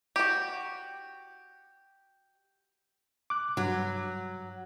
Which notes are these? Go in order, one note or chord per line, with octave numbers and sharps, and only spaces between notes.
F#4 G4
D6 F#6
G2 F#3